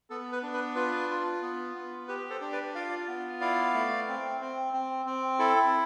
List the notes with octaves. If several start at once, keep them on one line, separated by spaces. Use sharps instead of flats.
B3 A4
B4
D4
B4
F4 B4
F4
B3
B3
G4 B4
A4 C5
D4
B4 D5
F4 D5 F5
B3
E4 D5 F5
A3
C4
C4
C4
C4
E4 A4